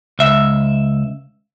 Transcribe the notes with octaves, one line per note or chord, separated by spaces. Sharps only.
C#2 E5